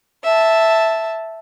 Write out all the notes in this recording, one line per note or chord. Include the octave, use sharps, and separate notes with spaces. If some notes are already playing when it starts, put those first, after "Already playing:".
E5 A5